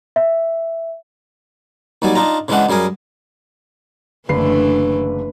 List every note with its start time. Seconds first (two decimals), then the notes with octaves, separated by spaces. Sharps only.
0.16 E5
2.02 D#2 F#3 G3 D5 G#5
2.15 D4 D#4 F4 A#5
2.48 C#3 E3 G#3 C#4 D4 F#5
2.69 F#2 G3 G#4 A#4 G#5
4.29 F#1 D3 E3 A3 D4 B4 C7